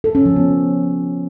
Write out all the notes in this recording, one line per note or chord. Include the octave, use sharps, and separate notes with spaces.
A4
C#4
F3
B3